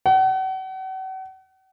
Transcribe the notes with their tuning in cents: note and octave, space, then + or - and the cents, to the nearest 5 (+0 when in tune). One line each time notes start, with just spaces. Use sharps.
F#5 +40